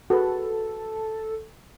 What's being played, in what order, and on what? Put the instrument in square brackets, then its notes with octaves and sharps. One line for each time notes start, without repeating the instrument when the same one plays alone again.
[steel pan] F#4 G#4 B4 [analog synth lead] A4